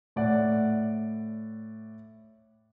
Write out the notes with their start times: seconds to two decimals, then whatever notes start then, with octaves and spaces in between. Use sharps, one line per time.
0.16 A2 D5 F#5